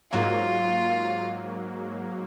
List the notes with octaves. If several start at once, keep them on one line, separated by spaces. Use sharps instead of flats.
G#2 F#3 A#3 F4